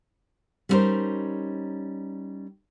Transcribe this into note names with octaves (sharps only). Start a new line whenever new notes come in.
G3 B3 C#4 D#4 A#4 C5